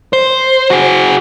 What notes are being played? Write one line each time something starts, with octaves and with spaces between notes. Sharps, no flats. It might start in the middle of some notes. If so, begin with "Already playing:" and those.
C5
F#4 G#4